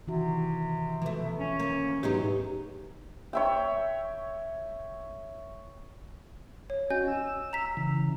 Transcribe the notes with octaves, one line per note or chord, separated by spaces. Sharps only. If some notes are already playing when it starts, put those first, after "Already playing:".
C3 D#3 E3 F#4
B2 F3 A3
C#4
D2 A#3
G#2 F#3 B3 D#4 G4 C#5
C#5 E5 G5
C#5
C#4 F#4 D#5 G#5 G6
E6
A#5 B6
C#3 E3